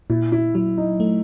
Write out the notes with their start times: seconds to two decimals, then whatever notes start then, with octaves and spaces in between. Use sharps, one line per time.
0.10 A#2 E4
0.32 E4
0.55 F#3 E4
0.78 D#4
1.00 A3